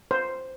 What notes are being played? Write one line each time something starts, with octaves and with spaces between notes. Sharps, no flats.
C5